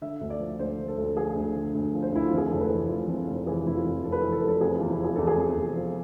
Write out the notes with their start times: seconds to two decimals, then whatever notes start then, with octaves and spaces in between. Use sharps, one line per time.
0.01 D3 E5
0.21 D2
0.30 D5
0.40 F3
0.59 D2 C5
0.78 D3
0.88 A4
0.98 D2
1.17 F3 G#4
1.36 D2
1.55 D3
1.75 D2
1.94 F3
2.02 C5
2.12 D2 E4
2.27 F2 F4
2.38 G#4
2.49 F1 A4
2.61 B4
2.70 E3
2.89 F1 F4
3.08 F2
3.17 F4
3.27 F1
3.46 E3 G#4
3.65 F1 E4
3.76 F4
3.85 F2
4.04 F1 A4
4.12 B4
4.21 E3 A4
4.32 A4
4.41 F1 B4
4.48 A4
4.61 C3 G#4
4.75 E2 F4
4.89 E4
4.99 F3 G#4
5.16 E2 A4
5.27 G#4
5.37 C3
5.57 E2
5.76 F3